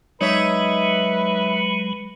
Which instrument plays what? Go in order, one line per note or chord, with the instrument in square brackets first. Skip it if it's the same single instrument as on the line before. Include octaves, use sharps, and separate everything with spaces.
[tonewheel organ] F#3 G#3 [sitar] D#4 C#5 E5 [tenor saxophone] B4